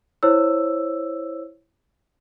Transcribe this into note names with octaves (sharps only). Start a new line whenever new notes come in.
E4 C5 C#5 E6